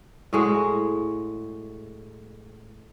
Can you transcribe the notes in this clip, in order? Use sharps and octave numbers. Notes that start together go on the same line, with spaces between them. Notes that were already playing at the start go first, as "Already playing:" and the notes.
A2 G#3 F#4